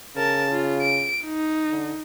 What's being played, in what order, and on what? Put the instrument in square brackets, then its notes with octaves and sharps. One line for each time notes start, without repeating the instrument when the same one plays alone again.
[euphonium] C#3 [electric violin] A#4 A5
[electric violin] F4
D7
D#4
[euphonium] D3